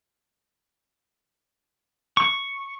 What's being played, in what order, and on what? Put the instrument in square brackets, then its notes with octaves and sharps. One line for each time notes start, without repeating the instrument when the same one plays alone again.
[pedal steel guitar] C#6